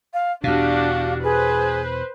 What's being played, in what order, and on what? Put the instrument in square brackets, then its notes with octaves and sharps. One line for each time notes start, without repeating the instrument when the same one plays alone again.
[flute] F5
[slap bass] E2 B2 [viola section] D4 F#4 G4 [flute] F5
[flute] G#4 [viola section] B4 C5